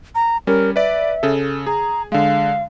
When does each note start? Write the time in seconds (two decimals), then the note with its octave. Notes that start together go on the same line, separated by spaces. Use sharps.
0.15 A#5
0.47 G3 C#4 A#4
0.76 B4 D5 E5
1.23 C#3 A4
1.67 G#4 A#5
2.12 D3 G#3 F5